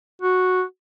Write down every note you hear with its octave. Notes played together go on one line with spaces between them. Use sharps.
F#4